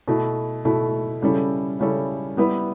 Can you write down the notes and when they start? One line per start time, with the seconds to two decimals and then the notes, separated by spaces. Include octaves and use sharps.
0.08 B2 A3 E4
0.65 B2 A3 E4
1.22 C#3 G3 C#4 E4 A4
1.80 C#3 G3 C#4 E4 A4
2.37 G3 B3 E4 B4